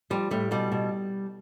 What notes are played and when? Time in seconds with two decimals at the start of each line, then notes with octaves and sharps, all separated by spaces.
0.10 F3 G3
0.31 A2 G3
0.51 B2 G3
0.72 B2